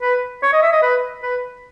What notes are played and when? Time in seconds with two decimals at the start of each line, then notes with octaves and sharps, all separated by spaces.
0.02 B4
0.43 C#5
0.53 D#5
0.63 E5
0.73 D#5
0.82 B4
1.23 B4